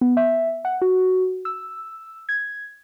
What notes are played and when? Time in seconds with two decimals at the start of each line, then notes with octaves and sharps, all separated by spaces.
0.01 B3
0.17 E5
0.65 F#5
0.82 F#4
1.45 E6
2.29 G#6